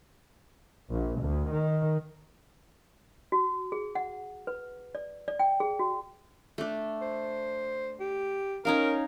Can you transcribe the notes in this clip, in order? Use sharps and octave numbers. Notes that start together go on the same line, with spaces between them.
A#1
D2
D#3
F#4
G#4
F#5
B4
D5
D5
G5
G#4
F#4
A3 D4
C5
G4
C#4 D#4 A#4 F5